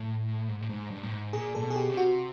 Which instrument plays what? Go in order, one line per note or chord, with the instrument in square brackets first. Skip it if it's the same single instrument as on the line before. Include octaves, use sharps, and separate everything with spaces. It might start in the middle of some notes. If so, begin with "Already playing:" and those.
Already playing: [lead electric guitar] A2
G#2
A2
G#2
G2
A2
G#2
[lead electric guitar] A#2 [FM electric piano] G#4
[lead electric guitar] A#2 [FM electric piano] A4
[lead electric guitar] B2
[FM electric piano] G#4
G4
[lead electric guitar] C3
[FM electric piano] F#4